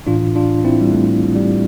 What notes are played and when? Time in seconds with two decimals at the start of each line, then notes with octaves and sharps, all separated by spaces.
0.07 A2 E3 D4 F4
0.35 D4 F4
0.65 C4 E4
0.81 G3
0.92 A3
1.36 G3